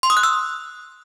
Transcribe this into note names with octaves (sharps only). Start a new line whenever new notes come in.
C6
D#6
F#6
E6